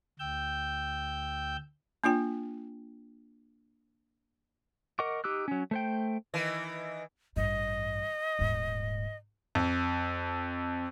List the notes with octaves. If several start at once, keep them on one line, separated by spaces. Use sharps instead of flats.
D2 G5 E6 G6
A#3 D4 F4 G5
A#4 D#5 F#5 C#6 D6
D#4 G4 D6 E6 F#6
F#3 C#4
A3 C5 G5
D#3 E3
A1 G2 D#5
D#1 G#2
F2